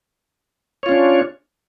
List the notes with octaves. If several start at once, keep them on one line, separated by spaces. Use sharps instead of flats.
C#4 D4 F4 C#5